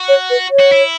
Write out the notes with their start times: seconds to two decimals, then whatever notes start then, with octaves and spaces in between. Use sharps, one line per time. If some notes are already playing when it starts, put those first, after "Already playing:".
Already playing: F#4
0.09 C#5
0.30 B4
0.51 C#5
0.59 F#4
0.72 E4